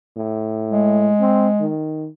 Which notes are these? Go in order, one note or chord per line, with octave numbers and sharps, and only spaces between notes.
A2
G#3
C4
D#3